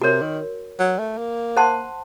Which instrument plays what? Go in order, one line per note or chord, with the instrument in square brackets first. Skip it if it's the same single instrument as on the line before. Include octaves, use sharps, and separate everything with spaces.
[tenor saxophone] C3 [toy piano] F#4 A#4 C#5
[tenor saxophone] D#3
F#3
A3
A#3
[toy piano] C5 F#5 A5 C6